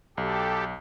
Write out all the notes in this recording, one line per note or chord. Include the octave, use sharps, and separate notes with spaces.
B1 G4 A4